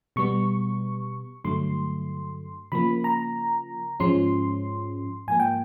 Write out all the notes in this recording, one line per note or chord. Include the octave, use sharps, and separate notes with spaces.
B2 G3 B3 C#6
G2 D3 F#3 A3 C6
C#3 F3 A#3 B5
A#5
G#2 F3 G#3 C#4 C6
G#2 F3 A#3 G#5
G5